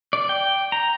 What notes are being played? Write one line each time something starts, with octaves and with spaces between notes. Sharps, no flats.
D5
G5
A#5